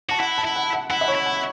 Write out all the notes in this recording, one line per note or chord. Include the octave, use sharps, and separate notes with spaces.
F#4 A5
E4 F#5
A5
E4
F#5
F#5
E4 F#5
E5
C#5
E4
F#5